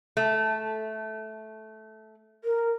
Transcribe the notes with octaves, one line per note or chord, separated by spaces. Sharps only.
A3
A#4